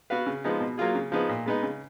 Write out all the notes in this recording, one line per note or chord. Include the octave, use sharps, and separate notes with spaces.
B3 F#4 B4 F5
C#3
F3 G#3 B3 D#4
B2
F#3 A#3 F4 G#4
C#3
F3 B3 D#4 G#4
A#2
G#3 B3 D#4
C#3